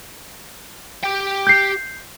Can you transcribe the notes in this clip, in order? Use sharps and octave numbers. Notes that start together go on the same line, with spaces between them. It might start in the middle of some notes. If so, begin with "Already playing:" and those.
G4 G5
G6 C7